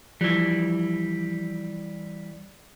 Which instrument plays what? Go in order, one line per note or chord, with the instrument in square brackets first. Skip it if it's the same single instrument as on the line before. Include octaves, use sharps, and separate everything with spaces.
[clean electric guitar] E3 G3 [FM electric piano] F3